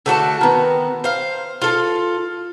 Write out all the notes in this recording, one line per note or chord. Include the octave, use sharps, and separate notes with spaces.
D3 A3 F#4 A5
D#3 B3
C5 F5
F4 A4